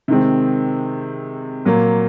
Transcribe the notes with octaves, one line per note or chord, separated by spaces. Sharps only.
C3 D#3 G#3 C4
A#2 F#3 A#3